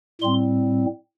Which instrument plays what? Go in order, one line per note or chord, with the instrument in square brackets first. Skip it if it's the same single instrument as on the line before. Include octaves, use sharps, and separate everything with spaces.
[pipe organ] A2 G3 C4 C6